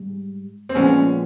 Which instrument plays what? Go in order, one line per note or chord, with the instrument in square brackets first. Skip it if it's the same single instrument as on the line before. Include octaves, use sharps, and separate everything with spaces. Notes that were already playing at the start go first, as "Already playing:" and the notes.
Already playing: [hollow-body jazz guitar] G#2 G3
[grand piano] C4
[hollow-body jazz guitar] A#2 F3 G#3 B3 [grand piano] C#4